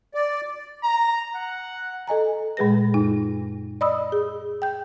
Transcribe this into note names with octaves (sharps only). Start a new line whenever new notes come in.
D5
A#5
F#5
A4 D#5 G#5 A#5
A#2 G#3 G#4 B4 A#6
F#2 D#4
D5 D#5 B5 D#6 E6
G#4
G5 G6